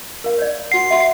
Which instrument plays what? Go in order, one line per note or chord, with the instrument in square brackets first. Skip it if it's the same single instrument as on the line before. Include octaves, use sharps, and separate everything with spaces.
[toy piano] A#4 F5
C#5 D5
[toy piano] F#4 F#5 [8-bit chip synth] C7
[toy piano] E5 F#5 C6